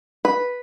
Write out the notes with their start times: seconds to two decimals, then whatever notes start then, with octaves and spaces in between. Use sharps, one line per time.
0.25 B4